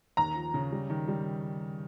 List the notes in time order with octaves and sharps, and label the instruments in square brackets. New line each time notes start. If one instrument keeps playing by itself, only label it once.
[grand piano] D#2 [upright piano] A#5
[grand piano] F3
C#3
G3
D#3
G3